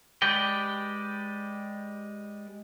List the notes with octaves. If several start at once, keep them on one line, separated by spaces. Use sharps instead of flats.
G#3 G4 B4 D5 G5